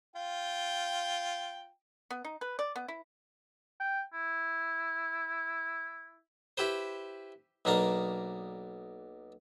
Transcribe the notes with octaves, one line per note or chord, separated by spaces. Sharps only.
F4 G5
B3
D#4
B4
D5
B3
E4
G5
E4
E4 G4 B4 C5
B1 B2 A#3 D4 F5 A#5